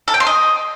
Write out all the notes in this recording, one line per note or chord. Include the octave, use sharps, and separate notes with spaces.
A4
G5
C6
D#5